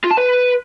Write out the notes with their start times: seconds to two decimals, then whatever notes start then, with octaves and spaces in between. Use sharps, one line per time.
0.04 F4
0.11 A5
0.18 B4